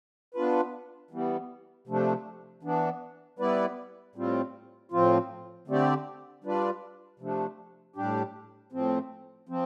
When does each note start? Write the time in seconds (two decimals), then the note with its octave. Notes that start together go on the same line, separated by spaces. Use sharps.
0.34 B3 D4 F4 B4
1.11 E3 G3 B3
1.87 C3 F3 A3 D4
2.63 E3 B3 D4
3.39 G3 B3 E4 B4 D5
4.15 A2 G3 C4 F4
4.92 A2 F3 C4 F4
5.68 D3 A3 C4 G4 D5
6.44 G3 D4 F4 B4 D5
7.19 C3 F3 A3 D4
7.96 A2 G3 D4 G4
8.72 A2 F3 C4
9.49 F3 C4